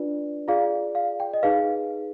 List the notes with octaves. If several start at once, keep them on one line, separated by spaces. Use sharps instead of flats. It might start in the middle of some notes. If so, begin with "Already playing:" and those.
Already playing: D4 F4 B4 D5
F4 G#4 D5 F5
F5
G5
D#5
D#4 G#4 B4 F5